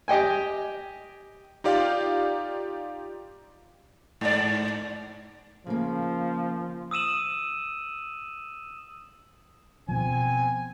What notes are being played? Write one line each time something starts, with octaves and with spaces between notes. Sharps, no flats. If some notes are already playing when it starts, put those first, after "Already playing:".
G4 D#5 G5 G#5
D#4 F4 G4 D5 F5
G#2 D5
C#3 F3 A#3
D#6 E6 D#7 E7 F#7
B2 F3 C4 G#5